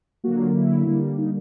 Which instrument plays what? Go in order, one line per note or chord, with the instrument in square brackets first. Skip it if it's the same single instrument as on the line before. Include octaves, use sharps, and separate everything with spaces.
[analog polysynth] D3 F#3 A#3 F#4
F4
E4
D3 G3 A#3
D#4